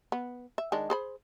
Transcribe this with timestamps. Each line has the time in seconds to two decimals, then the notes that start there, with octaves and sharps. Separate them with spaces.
0.12 B3
0.58 E5
0.72 D#3 G#3 D4
0.90 G#4 C5 B5